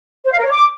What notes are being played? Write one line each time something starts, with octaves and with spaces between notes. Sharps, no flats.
C5
F5
A#4
C#5
D6